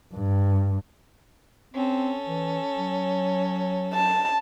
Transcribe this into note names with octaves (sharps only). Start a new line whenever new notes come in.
G2
C4 C#4 A4
E3
F#3
A5